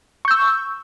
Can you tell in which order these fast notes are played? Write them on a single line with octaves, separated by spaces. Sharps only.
C#6 G6 E6